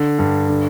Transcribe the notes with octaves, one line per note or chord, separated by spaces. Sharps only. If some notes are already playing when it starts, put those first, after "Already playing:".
Already playing: D3
G2
D3